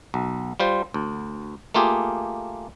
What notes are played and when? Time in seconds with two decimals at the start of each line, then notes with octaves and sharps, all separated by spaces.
0.14 B1
0.60 G3 F4 C5
0.94 D2
1.74 A3 A#3 F4 G4 G#4